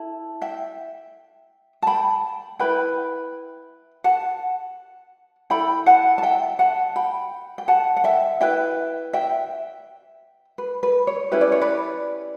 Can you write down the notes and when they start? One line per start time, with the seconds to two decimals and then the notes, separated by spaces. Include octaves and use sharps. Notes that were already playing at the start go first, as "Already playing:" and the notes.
Already playing: E4 A4 A5
0.41 E5 G5
1.82 A5
1.87 G5 B5
2.59 E4 B4 G5 B5
4.04 F#5 A5
5.50 E4 A4 G5 B5
5.86 F#5 A5
6.18 A5
6.23 E5 G5
6.59 F#5 A5
6.96 G5 B5
7.58 G5
7.68 F#5 A5
7.97 F#5
8.04 E5 G5
8.41 E4 B4 E5 G5
9.13 E5 G5
10.58 B4
10.83 B4
11.07 C#5
11.31 C#4 E4 G4 B4 E5
11.41 D5
11.52 C#5
11.61 B4 D5